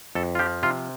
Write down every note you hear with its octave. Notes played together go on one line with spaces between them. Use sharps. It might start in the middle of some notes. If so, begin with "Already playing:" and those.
F2 A4
F4
F3 G4
C3 F4